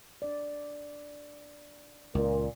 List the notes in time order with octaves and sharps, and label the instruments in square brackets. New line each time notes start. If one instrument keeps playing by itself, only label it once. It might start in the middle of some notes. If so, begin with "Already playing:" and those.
[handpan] D4 D5
[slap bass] C#2 [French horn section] A#2 [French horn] A#4